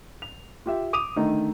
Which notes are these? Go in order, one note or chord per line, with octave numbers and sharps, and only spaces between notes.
F7
F4 G4 E5
D6 D#6 D#7 F7
D3 D#3 A3 D#4